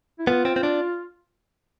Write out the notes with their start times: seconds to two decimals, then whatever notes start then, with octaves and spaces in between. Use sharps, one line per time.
0.19 E4
0.27 B3 F4
0.45 C4
0.56 C4
0.63 D4